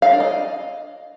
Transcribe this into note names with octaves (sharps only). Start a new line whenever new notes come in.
F5
D4
D#5